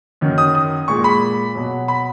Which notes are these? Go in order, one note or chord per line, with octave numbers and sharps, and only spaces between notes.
F#2 D#3 F#3
D#6
D#6
A#2 G#3 C#6
B5
B2 F#3
B5